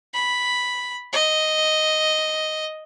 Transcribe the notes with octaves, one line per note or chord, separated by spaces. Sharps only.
B5
D#5